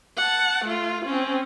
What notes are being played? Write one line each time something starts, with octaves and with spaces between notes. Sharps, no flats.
F#5 A5
A3 F4
C4 C#4